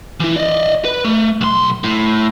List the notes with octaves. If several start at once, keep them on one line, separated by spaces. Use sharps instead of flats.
E3 E4
D5 D#5
B4
A3
B1 C6
A2